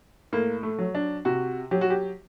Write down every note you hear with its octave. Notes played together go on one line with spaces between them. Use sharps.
A2 A#3
A3
F#3
D4
C3 F#4
F#3 G4
F#4
G4